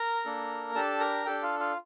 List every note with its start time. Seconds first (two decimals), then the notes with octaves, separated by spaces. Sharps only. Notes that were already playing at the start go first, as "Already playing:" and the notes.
Already playing: A#4 A#5
0.25 A#3 D4 A4
0.75 D4 G4 A4 A5
1.00 A#4 A#5
1.26 D4 G4 A4 G5
1.43 F4 F5
1.60 F4 F5